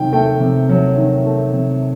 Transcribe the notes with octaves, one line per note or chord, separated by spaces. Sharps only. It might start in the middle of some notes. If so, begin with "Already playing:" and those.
Already playing: C3 D#3 F#3 G5
A3 G5
C3
F#3
D#3
A3
C3